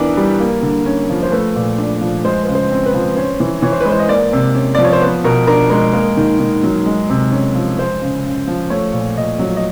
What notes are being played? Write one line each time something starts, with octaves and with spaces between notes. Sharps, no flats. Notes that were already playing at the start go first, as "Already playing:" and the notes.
Already playing: E3 B3 D4 A#4
G3
A#3
D3
C#4
F3
C5
A3 B4
A#2
D4
F3
G#3 C5
C#3 B4
C5
C4
B4
F3
C#4 C5
E3
E3 C#5
C5
B4
G#3 C5
D#5
A#3 D5
C3
C#4
F3 D5
C#5
C5
B3 B4
B2 A#4
D4 A#4
G#3 A#4
A#3 A#4
D#3
D#3
F#3
G#3
C3
C#4
F3
G#3 C5
C#3
C#3
F3
A3 C#5
A#2
A#2 D#5
F#3
D#5